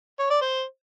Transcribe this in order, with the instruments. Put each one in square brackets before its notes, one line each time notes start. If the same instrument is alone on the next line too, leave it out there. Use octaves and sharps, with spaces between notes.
[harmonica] C#5
D5
C5